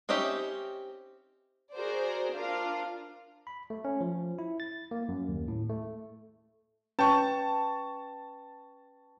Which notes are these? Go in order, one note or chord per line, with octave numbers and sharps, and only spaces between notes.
C4 C#4 D#4 G4 E5
F#4 G#4 A#4 C5 D5
D4 F4 A#4 F5
B5
A3
C#4
F3
E4
A6
A#3
F#2
D#2
A2
A3
C#4 B4 G5 A5 C#6